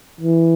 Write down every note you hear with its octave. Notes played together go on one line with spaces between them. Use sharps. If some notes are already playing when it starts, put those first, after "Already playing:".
E3